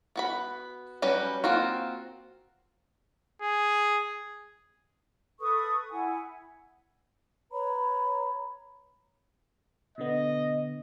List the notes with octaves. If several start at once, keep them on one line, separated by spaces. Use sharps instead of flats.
B3 F#4 B5
F#3 G3 C#4 B4
A#3 C4 F4 F#4
G#4
A4 B4 C#6 D#6
E4 F#5 G#5
B4 C#5 A#5 B5
B2 D3 B3 D#5